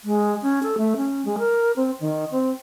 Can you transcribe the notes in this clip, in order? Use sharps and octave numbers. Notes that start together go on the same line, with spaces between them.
G#3
C#4
A4
A3
C#4
G#3
A#4
C4
D#3
C4